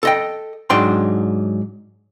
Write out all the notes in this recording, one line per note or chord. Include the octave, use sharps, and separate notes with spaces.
A4 D#5 G5
G#2 F#3 D4 G5 C6